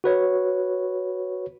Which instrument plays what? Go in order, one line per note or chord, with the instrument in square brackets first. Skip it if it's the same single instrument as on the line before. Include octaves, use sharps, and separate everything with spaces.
[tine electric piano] F#4 B4 C#5